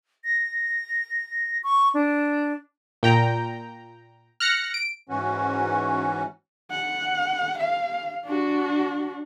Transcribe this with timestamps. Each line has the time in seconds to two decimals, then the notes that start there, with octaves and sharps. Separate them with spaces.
0.24 A#6
1.64 C#6
1.94 D4
3.03 A#2 G5 A#5
4.40 F6 F#6 A#6 C#7
4.74 D7
5.09 G#2 E3 C#4 F#4
6.71 F#5
7.58 F5
8.25 D4 F#4